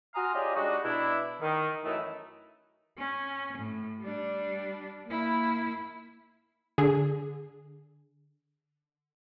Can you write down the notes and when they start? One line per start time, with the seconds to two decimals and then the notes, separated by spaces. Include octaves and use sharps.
0.15 F#4 G#5 A#5 C6 D#6 F6
0.34 C#4 F4 G4 G#4 D5 D#5
0.56 G3 G#3 D4 D#4 F#4
0.84 B2 D4 E4
1.41 D#3
1.85 F#2 D#3 E3 A3 D#4 E4
2.98 C#4
3.58 A2
4.01 G3 D4
5.06 A#3 E4
6.78 D3 G#4